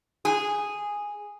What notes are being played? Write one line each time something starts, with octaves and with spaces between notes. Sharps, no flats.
G#4